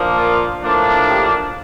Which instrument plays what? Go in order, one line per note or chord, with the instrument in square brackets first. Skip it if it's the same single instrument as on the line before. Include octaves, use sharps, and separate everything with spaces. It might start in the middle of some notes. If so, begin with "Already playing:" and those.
Already playing: [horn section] A#2 F3 A#3 D4
F4
A2 F3 A#3 D4
G4